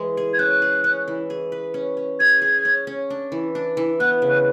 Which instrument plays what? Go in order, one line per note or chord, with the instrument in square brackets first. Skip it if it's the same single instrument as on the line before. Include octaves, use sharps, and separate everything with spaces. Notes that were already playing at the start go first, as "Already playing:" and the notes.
Already playing: [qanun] E3 G#3
G#4
[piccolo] G#6
[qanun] C#4 [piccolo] F#6
[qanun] G#4
C#4
E3
G#4
B4
C#4
C#4
[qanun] G#4 [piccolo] G#6
[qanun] G#4
C#4
C#4
D4
E3
D4
E3
[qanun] B3 [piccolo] F#6
[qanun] C#3
[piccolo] F#6